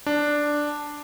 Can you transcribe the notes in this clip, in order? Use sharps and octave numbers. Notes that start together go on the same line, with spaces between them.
D4